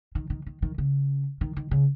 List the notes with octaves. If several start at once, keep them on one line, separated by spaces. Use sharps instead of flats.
D#3
D#3
D#3
D#3
C#3
D#3
D#3
C#3